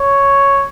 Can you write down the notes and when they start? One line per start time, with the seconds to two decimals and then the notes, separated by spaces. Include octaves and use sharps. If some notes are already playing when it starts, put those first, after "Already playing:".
Already playing: C#5